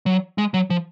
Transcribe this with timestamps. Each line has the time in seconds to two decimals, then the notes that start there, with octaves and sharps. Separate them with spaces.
0.06 F#3
0.38 G#3
0.54 F#3
0.70 F3